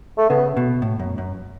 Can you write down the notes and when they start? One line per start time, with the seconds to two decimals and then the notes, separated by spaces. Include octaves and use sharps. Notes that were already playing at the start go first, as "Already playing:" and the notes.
0.18 A3
0.29 C#3 B3
0.57 B2
0.82 A2
0.99 F#2
1.18 F#2